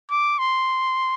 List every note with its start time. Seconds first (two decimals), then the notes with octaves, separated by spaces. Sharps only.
0.10 D6
0.38 C6